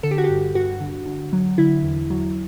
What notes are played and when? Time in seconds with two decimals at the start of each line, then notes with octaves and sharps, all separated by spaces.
0.03 D3 A4
0.11 G4
0.18 F#4
0.24 G4
0.30 G2
0.55 G2 F#4
0.80 D3
1.06 D3
1.33 F#3
1.58 D3 E4
1.84 E2
2.10 F#3